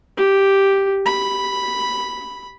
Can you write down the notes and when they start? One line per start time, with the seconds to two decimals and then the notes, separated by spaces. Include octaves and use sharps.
0.17 G4
1.06 B5